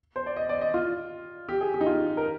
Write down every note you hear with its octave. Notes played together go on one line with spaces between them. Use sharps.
C5
D5
D#5
D5
D#5
F4
G4
G#4
G4
D#4
F4
A#4